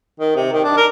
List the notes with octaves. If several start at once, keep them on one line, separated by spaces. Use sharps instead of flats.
D#3
C3
D#3
D4
A#4